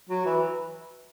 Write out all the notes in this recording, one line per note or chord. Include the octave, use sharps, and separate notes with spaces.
F#3
E3